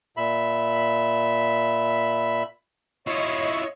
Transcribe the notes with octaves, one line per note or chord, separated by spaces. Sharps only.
A#2 E5 B5
E4 F4 C#5 D#5 C#6